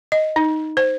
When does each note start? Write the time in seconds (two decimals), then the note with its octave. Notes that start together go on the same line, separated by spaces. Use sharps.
0.12 D#5
0.36 D#4
0.77 C5